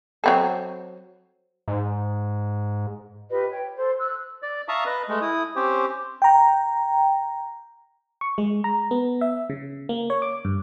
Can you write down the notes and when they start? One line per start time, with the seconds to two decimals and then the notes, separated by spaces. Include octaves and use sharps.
0.24 F#3 C4 A4
1.68 G#2
3.29 F4 G4 B4 D#5
3.52 C#5 G5
3.76 A4 C5
3.99 E6 F#6
4.43 D5
4.68 E5 F5 A5 A#5 C#6 D#6
4.86 B4 D#5
5.09 G#3 A3
5.21 E4 D#6
5.56 C4 C#4 G4 C5
6.22 G5 A#5
8.21 C#6
8.38 G#3
8.64 A#5
8.91 B3
9.21 E5
9.50 C#3
9.89 A#3
10.10 C#5
10.22 D6
10.45 G2